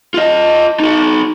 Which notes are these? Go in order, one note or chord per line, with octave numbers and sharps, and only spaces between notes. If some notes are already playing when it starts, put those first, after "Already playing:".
F4 D#5
D#4 F#4